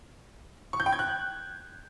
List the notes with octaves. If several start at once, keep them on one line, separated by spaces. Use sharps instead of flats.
C#6
G6
G5
G#6
F#6